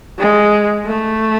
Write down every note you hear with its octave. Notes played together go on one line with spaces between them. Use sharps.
G#3
A3